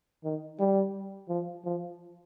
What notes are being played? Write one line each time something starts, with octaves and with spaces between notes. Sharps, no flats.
D#3
G3
F3
F3